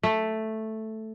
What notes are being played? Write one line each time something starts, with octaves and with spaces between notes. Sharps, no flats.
A3